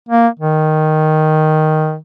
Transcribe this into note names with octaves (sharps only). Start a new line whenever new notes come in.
A#3
D#3